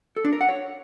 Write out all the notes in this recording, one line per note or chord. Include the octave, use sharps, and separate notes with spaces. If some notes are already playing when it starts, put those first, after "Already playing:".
A4
D4
A#4
F#5
C#5